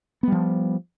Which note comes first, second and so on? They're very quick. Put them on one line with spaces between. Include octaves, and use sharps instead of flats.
B3 G3 F3